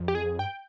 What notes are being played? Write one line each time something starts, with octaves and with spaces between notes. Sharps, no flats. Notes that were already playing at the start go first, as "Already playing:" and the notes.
Already playing: F2
G4
G#4
G2 G5